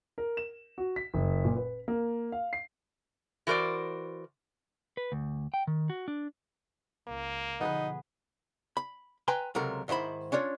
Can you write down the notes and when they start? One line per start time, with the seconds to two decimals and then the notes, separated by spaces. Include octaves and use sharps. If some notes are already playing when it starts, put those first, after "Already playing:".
0.18 A#4
0.37 E7
0.78 F#4
0.96 B6
1.14 F#1
1.45 A#2
1.56 B4
1.88 A#3
2.32 F5
2.53 C7
3.47 E3 F#4 A#4 C5 D5
4.97 B4
5.12 D2
5.54 G5
5.67 D#3
5.90 F#4
6.08 D4
7.08 C#2 A#3
7.61 B2 D3 F3 B3 D#4 G#4 B4
8.77 B5
9.28 B4 G5 G#5 A#5 C6
9.55 C#2 C3 F#3 A4 A#4
9.88 G#2 D#3 E4 C5 B5
10.32 C#4 D4 F4 C#5